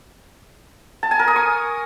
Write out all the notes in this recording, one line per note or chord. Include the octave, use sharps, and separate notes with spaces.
A5
G#5
A#4
D#6
C#6